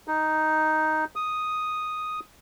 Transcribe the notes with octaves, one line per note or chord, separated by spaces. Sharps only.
D#4
D#6